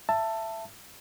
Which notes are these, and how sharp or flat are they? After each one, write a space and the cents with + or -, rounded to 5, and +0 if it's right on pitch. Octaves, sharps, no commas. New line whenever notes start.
E5 +20 A5 +15